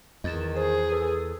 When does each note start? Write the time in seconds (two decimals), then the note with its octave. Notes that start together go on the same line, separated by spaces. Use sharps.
0.24 E2 D#3 D#5 A6 E7
0.56 G#4 C5
0.92 A4 B4